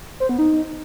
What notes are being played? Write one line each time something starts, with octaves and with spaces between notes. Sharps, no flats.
C5
B3
D#4